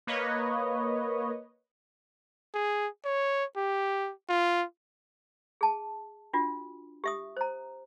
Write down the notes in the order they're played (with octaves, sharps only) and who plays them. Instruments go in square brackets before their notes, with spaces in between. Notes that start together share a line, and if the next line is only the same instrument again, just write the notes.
[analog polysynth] A#3 B4 C#5 D#5
[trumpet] G#4
C#5
G4
F4
[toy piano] G#4 A5
D4 F4 F#4
G4 E5 D#6
C5 A#5